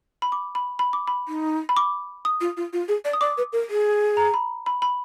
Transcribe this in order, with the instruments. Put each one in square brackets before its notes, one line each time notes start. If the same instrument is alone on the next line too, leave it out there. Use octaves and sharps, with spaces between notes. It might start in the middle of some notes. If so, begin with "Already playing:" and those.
[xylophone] B5
D6
B5
B5
D6
B5
[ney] D#4
[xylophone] B5
D6
D#6
[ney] F4
F4
F4
G#4
D5
[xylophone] D#6
[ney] D5 [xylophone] D6
[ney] B4
A#4
G#4
[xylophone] A#5
B5
B5
B5